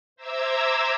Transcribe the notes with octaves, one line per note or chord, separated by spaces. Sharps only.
C5 E5 A#5 D6 E6 G#6